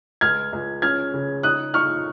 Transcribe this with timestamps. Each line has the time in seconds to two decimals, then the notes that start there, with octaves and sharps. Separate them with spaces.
0.21 C#2 F6 G#6
0.53 C#2
0.82 C#4 F6 G#6
1.14 C#3
1.43 D#4 D#6 F#6
1.74 D#4 C#6 F6